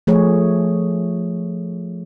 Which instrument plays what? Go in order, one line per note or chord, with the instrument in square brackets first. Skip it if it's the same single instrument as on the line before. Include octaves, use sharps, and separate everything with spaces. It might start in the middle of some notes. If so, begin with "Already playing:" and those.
[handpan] F3 A3 G#4 C#5